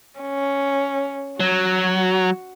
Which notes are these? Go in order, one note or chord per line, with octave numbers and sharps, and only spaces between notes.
C#4
F#3 F#4